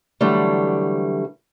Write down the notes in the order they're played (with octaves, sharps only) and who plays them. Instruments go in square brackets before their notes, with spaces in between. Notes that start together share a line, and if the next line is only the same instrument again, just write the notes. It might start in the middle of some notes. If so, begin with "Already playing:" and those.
[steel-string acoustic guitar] D3 E3 F#3 G3 A3